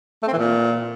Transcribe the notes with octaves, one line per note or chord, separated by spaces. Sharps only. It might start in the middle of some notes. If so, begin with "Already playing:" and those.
A3
C4
E3
A#2